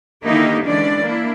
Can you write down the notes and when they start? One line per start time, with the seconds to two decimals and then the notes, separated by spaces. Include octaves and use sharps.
0.25 D3 D#3 A#3 D#4 E4 G4
0.65 D3 E3 G#3 C#4 D4 D5
1.02 A#3 D4 E4